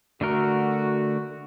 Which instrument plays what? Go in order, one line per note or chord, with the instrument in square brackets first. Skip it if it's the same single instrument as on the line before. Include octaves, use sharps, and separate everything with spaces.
[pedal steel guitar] D3 A3 A#4 [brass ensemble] F#4